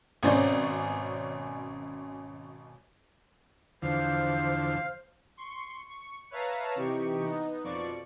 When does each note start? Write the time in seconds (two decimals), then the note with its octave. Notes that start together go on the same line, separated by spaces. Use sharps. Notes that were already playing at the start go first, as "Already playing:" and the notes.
0.23 G#1 B2 C#4 C5 D5
3.82 E2 D3 F3 C5 F5
5.37 C6 C#6
5.89 C#6
6.31 B4 C#5 E5 F5 A5 A#5
6.76 C3 E3 D#4 G4 C#6
7.23 B3 D#4
7.64 F2 B2 F3 D5 C#6